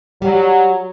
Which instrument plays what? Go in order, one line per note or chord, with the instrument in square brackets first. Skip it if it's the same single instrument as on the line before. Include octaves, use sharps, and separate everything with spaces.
[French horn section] F#3 [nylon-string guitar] G3